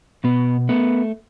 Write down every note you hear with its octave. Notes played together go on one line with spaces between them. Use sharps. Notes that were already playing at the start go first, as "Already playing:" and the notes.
B2 B3
A3 B3